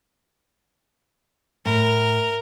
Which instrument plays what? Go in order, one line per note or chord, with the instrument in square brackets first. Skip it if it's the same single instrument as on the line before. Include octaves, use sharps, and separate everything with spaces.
[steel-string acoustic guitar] A2 [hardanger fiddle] A#4